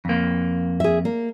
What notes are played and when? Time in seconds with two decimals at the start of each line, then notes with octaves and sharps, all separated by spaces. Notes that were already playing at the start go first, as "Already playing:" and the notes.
0.05 F2 A#3
0.80 G#4 E5
1.05 A#3